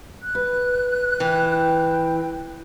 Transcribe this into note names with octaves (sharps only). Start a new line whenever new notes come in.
F#6
B4
E3 G5